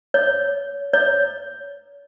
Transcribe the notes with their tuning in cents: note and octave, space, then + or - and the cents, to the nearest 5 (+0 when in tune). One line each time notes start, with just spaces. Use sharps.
C#5 +25
C#5 +35